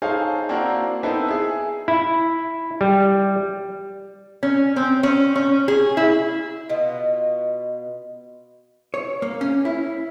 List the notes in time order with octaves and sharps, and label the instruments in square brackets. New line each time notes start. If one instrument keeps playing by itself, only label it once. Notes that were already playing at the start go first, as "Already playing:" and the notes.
[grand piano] D#4 G#4 A4 C5 C#5 F5
A#3 C4 D4 E4 F#4 A#4
B3 C4 D#4 E4 A4 B4
G#4 E5
[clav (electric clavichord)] E4
G3
[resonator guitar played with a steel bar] C#4
C4
C#4
C#4
G#4
E4
[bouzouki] B2 B3 F4 D#5
[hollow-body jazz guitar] C#5
A#3
C#4
E4